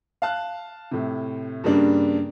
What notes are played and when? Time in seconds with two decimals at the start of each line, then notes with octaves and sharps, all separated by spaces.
0.22 F5 A5 F#6
0.91 A2 C3
1.64 G2 C#3 G3 A#3 D4